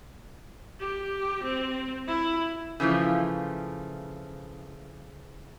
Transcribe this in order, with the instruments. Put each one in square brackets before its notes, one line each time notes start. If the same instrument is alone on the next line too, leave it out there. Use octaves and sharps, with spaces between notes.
[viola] G4
C4
E4
[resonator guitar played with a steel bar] C#3 E3 F3 A3